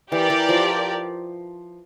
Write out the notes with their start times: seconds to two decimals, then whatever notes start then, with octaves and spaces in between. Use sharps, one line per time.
0.11 E3 G4 A#4 D5
0.30 E3
0.49 F3